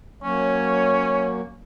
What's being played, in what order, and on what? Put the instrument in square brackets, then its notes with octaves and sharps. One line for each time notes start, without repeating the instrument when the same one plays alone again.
[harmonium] F#3 A#3 [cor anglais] C#4 [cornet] C#5